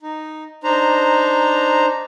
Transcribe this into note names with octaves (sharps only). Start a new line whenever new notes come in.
D#4
D4 D#4 C5 A#5